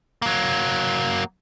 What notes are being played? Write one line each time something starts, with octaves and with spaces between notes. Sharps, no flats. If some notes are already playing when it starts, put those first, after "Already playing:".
F#3 A#3